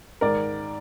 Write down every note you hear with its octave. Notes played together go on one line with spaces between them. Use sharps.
G#2 D#3 A#4 D5